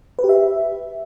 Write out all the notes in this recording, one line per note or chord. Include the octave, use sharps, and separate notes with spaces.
B4
G4
E5